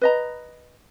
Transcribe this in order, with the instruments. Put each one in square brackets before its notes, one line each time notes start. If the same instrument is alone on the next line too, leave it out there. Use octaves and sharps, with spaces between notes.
[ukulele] B4 D#5 A#5